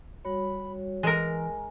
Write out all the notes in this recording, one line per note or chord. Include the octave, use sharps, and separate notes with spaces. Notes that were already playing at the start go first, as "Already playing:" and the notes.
G3 F#4 C#5 B5
E3 G#3 A#4 G#5